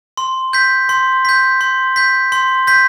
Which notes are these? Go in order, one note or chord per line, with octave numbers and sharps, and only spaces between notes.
C6
G6 B6
C6
G6 B6
C6
G6 B6
C6
G6 B6